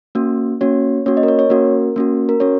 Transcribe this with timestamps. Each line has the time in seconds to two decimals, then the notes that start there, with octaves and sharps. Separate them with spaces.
0.15 A#3 C#4 F#4
0.61 A#3 C#4 F#4 C#5
1.06 A#3 C#4 F#4 C#5
1.17 D#5
1.23 A#4
1.28 C#5
1.39 C#5
1.50 A#3 C#4 F#4 A#4
1.96 A#3 C#4 F#4
2.29 A#4
2.40 C#4 F#4 C#5